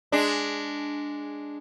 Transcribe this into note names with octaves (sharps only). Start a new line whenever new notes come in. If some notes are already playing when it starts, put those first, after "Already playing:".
G#3 D4